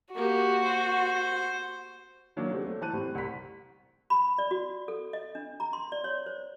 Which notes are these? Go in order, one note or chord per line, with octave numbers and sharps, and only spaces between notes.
A#3 F#4 G4
C5
D#3 F#3 A#3 D4
C#3 F#3 G3 A3 C4
A3
E3 C5 A5 F#6 D#7
A2 G3 C4
C2 B6
B5
D5
F#4
A4
D#5
D4
A#5
C6
D5
C#5
C5